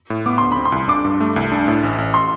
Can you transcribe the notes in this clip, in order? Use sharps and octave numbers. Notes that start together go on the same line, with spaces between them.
A2
B3 D6
D2 C6
B5
C4
C6
C2
D4 D6
G2
A3
C2
D4
A2
A1
A1
C6